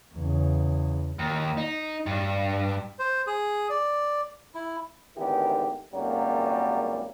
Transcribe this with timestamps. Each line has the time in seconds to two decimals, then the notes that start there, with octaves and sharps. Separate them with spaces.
0.15 E2 C#3
1.19 D#2
1.58 D#4
2.06 G2
2.99 C5
3.27 G#4
3.70 D5
4.55 E4
5.17 G#1 D2 D#3 E3 B3 G4
5.93 G#1 C#2 F#2 F#3 G3 A#3